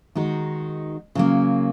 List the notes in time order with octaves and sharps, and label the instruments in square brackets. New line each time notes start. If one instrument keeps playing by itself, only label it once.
[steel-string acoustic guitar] D#3 G#3 D#4 F#4
C#3 F#3 A#3